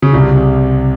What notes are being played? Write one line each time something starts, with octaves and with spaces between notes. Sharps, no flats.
C#3
C2 C3